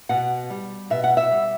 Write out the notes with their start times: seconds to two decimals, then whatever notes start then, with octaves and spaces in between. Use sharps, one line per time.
0.09 B2 F#5
0.50 G3
0.90 B2 E5
1.04 F#5
1.17 E5
1.31 G3